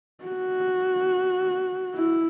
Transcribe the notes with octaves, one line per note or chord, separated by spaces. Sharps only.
F#4
E4